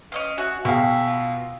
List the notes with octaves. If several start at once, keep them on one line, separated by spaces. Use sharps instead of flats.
C#4 D#5 F5
F#4 C#5 E5 G#5
B2 G#4 E5 F5 G5 C#6
F4